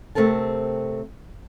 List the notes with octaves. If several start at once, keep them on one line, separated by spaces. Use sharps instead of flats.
C3 A3 C4 A4 A#4 A5